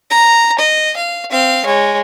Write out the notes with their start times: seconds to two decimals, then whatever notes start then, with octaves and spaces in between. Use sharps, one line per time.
0.10 A#5
0.59 D#5
0.97 F5
1.31 C4 F5
1.65 G#3 C#5